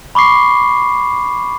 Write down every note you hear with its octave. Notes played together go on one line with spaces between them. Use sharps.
B5 C#6 D6 C7